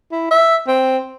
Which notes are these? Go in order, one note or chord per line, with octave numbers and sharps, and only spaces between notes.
E4
E5
C4